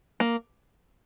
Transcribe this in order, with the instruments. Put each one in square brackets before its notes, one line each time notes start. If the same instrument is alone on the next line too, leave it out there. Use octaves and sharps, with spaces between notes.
[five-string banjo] A#3